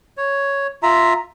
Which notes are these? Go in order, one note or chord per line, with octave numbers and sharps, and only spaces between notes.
C#5
F4 E5 A#5